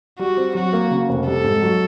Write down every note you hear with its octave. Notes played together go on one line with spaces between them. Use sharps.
G3 F#4
C4
F#3 F#4
A#3
C#3
F1
G3 A4
G#2
F#3